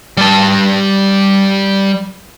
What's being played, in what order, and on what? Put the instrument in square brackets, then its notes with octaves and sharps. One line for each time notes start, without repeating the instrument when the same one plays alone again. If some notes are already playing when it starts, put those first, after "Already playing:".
[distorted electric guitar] G3 A5